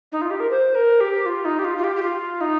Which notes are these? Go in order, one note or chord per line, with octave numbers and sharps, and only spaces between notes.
D#4
F4
G4
A#4
C5
A#4
G4
F4
D#4
G4
F4
F4
G4
G4
F4
D#4